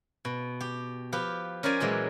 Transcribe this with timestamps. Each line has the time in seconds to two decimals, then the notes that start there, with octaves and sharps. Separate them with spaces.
0.25 B2
0.61 G4
1.12 F3 G4 B4
1.63 C#4 A#4 C5 D5 G#5 A#5
1.80 A#2 E3 F#3 G#3